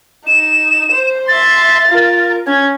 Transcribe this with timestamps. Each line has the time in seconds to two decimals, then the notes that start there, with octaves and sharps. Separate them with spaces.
0.27 D#4 E7
0.92 C5
1.28 E5 C6 A6
1.88 F4 A#4
2.47 C#4 G#6